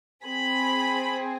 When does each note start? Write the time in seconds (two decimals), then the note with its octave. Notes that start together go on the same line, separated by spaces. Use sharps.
0.24 C4 G#4 B5